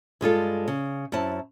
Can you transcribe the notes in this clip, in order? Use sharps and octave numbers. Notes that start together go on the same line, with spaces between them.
G2 G#3 F4 A4
C#3
F#2 C4 E4 A5